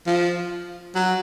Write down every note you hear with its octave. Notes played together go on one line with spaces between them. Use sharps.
F3
F#3